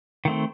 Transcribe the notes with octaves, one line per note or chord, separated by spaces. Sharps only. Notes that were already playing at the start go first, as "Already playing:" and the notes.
D#3 A3 C4